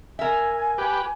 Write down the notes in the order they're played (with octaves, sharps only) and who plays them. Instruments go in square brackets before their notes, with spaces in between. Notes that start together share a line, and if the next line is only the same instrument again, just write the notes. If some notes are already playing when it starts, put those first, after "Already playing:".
[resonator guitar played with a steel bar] A#4 E5 [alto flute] G#5
[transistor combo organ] G4 B4